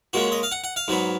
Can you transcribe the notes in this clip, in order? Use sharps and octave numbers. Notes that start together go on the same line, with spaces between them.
A#2 G#3 C#4 F#4
D#5
F5
F#5
F#5
F5
G#2 F#3 B3